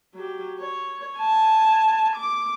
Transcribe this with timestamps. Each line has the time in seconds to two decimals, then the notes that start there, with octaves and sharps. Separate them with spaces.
0.14 F#3 G4
0.59 C#5
1.17 G#5 A5
2.16 D6